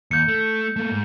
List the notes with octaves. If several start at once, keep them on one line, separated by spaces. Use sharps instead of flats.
D#2 G6 C#7
A3
A3 A#3
G#2